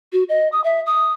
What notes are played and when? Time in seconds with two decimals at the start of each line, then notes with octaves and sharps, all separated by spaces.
0.13 F#4
0.29 D#5
0.52 D#6
0.64 E5
0.86 D#6